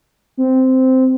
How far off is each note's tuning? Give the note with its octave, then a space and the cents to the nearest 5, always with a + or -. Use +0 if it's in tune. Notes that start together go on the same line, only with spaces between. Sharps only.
C4 -10